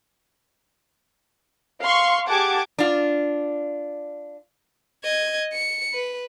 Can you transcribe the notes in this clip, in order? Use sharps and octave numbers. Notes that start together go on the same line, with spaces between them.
F5 C6 C#6
G4 G#4 F#5 A5 D6 G#6
D4 F4
D#5 G#6
C#7
B4